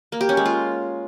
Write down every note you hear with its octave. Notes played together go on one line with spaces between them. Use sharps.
A#3
G4
C#4
G#3
F4